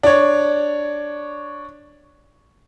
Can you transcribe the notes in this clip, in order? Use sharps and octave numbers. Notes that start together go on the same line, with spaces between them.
D4 C#5